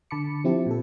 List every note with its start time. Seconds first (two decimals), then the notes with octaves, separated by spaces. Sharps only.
0.11 D3 A5 B5 D6 C#7
0.44 F3 C4 E4 G4
0.66 A#2 A4